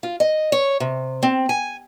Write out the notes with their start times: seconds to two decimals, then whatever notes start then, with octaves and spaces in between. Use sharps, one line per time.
0.03 F4
0.20 D#5
0.52 C#5
0.80 C3
1.23 C4
1.49 G#5